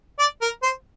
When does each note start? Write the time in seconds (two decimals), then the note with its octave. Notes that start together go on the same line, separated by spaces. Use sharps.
0.19 D5
0.41 A#4
0.63 C5